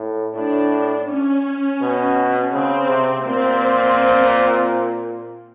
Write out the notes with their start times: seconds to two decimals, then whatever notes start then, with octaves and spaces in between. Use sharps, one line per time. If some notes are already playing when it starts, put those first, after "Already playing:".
Already playing: A2
0.35 A2 D4
1.09 C#4
1.81 B2
2.53 C#3 C4
2.89 C3
3.26 A#2 C4